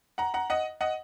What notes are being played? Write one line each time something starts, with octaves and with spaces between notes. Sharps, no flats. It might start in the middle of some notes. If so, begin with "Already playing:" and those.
F#5 A#5
F#5 A#5
D#5 F#5
D#5 F#5